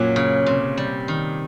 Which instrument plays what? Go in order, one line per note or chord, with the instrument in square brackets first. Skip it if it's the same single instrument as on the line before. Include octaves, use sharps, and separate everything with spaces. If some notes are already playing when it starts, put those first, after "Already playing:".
Already playing: [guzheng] F#2 F#3 [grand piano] A#2
[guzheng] C#3
C3
G3
D#3